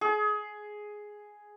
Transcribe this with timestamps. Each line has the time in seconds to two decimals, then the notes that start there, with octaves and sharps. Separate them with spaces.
0.01 G#4